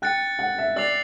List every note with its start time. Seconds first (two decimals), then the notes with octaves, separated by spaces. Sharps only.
0.02 G5 F#6 A6 C#7
0.39 F#5
0.58 E5
0.76 D5 E6 A6 C7 F7